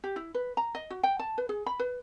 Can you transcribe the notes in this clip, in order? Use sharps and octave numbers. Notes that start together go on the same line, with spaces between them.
G4
E4
B4
A#5
D#5
F#4
G5
A5
B4
G#4
B5
B4